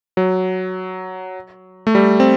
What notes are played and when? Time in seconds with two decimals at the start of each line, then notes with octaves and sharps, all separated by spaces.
0.17 F#3
1.87 A3
1.95 G3
2.20 C4